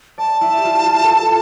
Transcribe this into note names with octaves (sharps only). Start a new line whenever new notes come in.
D5 A5
E4
G4
F4
F4
A4
G4